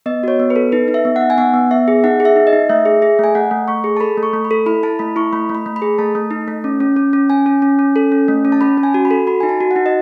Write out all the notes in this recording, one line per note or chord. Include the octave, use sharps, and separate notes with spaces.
B3 D#5
F#4 C#5
B3
B4
A4
D#4 B4
D#4
E5
B3
F#5
D#4
G#5
B3 F#5
B3
B3 E5
G#4
D#4 F#5
G#4
E5
D#4
D#5
D#4
A3 E5
G#4
G#4
A3 G#5
A3 F#5
A3
A3 C#6
G#4
A5
A4 B5
A3
C#6
A3
B5
A4
E4 B5
E4 A5
A3 B5
E4 C#6
A3 B5
A3
B5
A3
B5
G#4
A3 A5
A3
D#4
A3
C#4
C#4
C#4
C#4
C#4 G#5
C#4
C#4
C#4
A4
C#4
A3
C#4
A5
C#4 B5
C#4
G#5
F#4
B5
A4
F#4 B5
D#4 G#5
A5
F#4
F#5
D#4
D#5